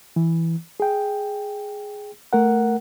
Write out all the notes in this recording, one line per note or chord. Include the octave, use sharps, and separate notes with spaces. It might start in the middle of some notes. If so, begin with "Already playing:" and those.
E3
G#4 G5
A3 A#4 F#5